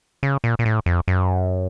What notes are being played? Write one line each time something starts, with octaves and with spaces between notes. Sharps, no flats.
C#3
A#2
A#2
A2
F2
F#2